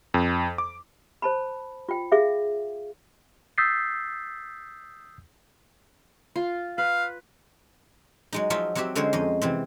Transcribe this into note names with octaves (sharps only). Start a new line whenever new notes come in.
F2
D6
C5 A5 B5
F4 G5
G#4 E5 F5
D#6 E6 G6 A6 B6 C7
F4
B4 F5
F#3 G#3 D#4
F3 F#3 D#4 F4 E5
F#3 C4 F#4 G4 E5
D3 G#3 C4 C#4 C5 C#5
F2 D#5
C3 E3 C4